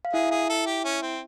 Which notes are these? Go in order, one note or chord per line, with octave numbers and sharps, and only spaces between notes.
F5
E4 G#4 E5
G#4
A4
G4
C#4
C4